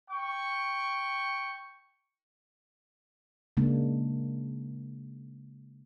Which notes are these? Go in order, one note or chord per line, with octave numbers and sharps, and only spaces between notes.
G5 C#6
C#3 G#3 A#3 D4